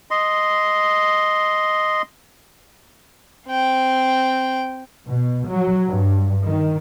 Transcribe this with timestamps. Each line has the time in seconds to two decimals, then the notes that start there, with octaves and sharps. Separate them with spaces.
0.11 D#5 C6
3.47 C4 G5
5.11 B2
5.49 F#3
5.88 G2
6.45 D#3